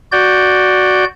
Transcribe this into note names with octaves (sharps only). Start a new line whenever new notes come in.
F#4 D5 G6